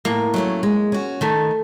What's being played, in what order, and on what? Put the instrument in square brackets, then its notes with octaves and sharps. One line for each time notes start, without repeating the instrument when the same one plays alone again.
[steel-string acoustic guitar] A2 [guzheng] A#3
[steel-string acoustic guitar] F#3 A3 C#4
G#3
C#4 F#4
[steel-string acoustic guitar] D#3 [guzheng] A3